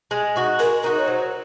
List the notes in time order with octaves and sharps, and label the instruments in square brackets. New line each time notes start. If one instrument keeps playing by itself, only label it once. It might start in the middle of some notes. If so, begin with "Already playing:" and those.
[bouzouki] G#3
D#4 F#4
[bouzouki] G#3 [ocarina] A#4
[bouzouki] D#4 F#4 [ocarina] A#4
[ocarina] C#5
[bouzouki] F#3 [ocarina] C5